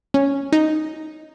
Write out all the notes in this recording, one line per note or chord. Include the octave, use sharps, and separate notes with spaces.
C#4
D#4